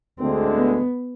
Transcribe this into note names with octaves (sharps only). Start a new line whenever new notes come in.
D2 D3 G#3 C4
B3